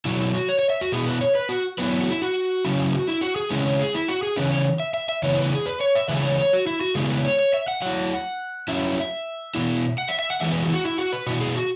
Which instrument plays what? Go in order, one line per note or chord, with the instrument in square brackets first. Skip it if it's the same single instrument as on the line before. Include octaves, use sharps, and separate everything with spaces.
[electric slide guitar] B2 F#3 E4 F#4
E4
F#4
C#5
C#5
E5
F#4
B2 B3 E4 G#4
B4
C#5
B4
F#4
F#3 B3 E4 B4
F#4
E4
F#4
C#3 F#3 C#4 E4
E4
F#4
G#4
C#3 G#3 C#4 E4 B4
C#5
G#4
E4
F#4
G#4
C#3 E3 C#4 E4 B4
C#5
E5
E5
E5
C#3 E3 B3 E4 C#5
B4
G#4
B4
C#5
E5
C#3 E3 G#3 E4 B4
C#5
C#5
F#4
E4
F#4
C#3 G#3 B3 E4 G#4
B4
C#5
C#5
E5
F#5
F#3 E4 F#5
F#3 C#4 E4 E5
B2 B3 E4
F#5
E5
E5
F#5
E3 G#3 B3 E4 E5
B4
F#4
E4
F#4
E4
F#4
B4
B2 B3 E4 F#4
G#4
F#4